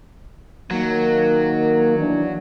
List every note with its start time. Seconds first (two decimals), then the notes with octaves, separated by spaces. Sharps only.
0.71 D#3 F#3 A#3
1.98 E3 D4